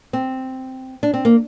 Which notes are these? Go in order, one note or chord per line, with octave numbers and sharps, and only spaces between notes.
C4
D4
C4
A#3